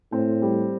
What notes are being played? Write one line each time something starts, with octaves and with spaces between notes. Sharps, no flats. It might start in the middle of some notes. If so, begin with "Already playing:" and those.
A2 C4
G3